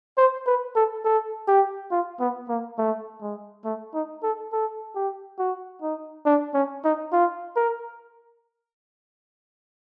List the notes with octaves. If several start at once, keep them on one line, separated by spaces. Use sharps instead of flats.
C5
B4
A4
A4
G4
F4
B3
A#3
A3
G#3
A3
D#4
A4
A4
G4
F#4
D#4
D4
C#4
D#4
F4
A#4